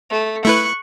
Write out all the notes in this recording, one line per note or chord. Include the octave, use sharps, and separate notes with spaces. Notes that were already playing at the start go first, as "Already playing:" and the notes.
A3
A3 E4 B4 C#6 F#6